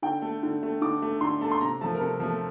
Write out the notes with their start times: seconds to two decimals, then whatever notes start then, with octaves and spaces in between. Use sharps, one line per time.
0.02 D3 G5
0.22 A3
0.43 D3
0.63 A3
0.81 D3 D6
1.02 A3
1.21 D3 C6
1.41 A3 A5
1.52 C6
1.61 C3 A#5
1.81 F3 A3 A5
1.95 A#4
2.01 C3 A4
2.20 F3 A3